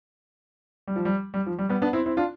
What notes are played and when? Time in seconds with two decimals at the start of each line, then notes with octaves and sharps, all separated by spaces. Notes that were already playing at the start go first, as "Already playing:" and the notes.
0.87 G3
0.96 F3
1.05 G3
1.34 G3
1.46 F3
1.59 G3
1.69 G3 B3
1.82 B3 D4
1.93 C4 E4
2.06 C4 E4
2.17 D4 F4